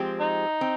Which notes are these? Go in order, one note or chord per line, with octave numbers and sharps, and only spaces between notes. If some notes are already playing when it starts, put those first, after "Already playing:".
Already playing: F3 G#3 C4 G4
D#4
C4